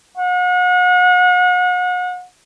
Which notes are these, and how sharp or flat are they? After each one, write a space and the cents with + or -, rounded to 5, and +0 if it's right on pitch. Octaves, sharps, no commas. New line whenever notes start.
F#5 -40